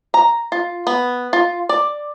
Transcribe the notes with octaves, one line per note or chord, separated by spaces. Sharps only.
A#5
F4
B3
F4
D5